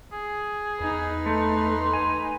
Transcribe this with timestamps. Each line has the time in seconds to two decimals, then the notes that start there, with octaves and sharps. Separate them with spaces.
0.12 G#4
0.80 E2 D#4 B4
1.26 A3 C6
1.93 G#5